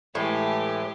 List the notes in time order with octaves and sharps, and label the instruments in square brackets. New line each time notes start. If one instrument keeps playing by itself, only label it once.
[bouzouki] A2 [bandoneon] E3 A3 [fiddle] G#3 G4